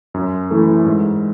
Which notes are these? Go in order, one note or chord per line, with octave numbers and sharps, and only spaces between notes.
F#2
E3 A3 E4 A4
G#2